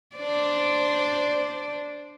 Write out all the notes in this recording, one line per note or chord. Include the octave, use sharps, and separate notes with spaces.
D4 C5 D5